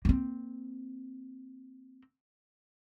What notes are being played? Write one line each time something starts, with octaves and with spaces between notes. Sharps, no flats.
A#3 C4